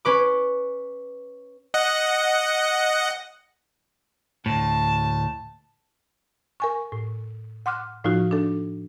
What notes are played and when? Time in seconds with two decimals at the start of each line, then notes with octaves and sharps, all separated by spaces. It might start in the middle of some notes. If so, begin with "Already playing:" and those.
0.05 C#4 B4 D6
1.74 D#5 F#5
4.46 D2 A2 A5
6.60 A#4 G#5 C#6
6.92 A2
7.66 F#5 C6 D6 F6 F#6
8.04 A2 F3 D#4 F4 F#4
8.31 D4 A4